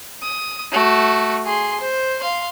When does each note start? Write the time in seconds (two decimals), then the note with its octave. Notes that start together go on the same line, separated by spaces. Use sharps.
0.23 D#6
0.72 A3 F#4
1.45 G#4 C6
1.80 C5
2.21 F5 C6